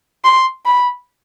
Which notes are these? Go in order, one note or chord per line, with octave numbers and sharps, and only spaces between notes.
C6
B5